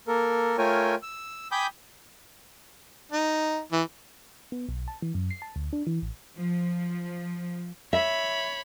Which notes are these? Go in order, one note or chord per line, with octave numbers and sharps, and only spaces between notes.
A#3 A4 A#4
A3 F4 A#4 C#5 G5 G#5
E6
G5 G#5 B5 D6 D#6 G6
D#4
E3
B3
B1
A5
E3
F#2
C7
A5
D2
D4
E3
A1
F3
C#5 E5 B5